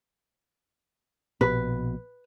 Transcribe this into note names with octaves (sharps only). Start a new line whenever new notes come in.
A#1 B2 B4